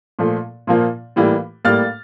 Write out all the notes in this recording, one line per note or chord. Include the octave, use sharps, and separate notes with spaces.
A#2 F3 A3
A#2 F3 A#3
A2 E3 G3 A#3
A2 G3 A#3 F6 A6